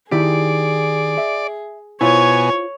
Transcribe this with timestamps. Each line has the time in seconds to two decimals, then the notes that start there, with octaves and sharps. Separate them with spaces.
0.12 D#3 E4 G4 G#4 D5
1.18 E5
2.01 B2 E4 F4 C5 C#5 G#5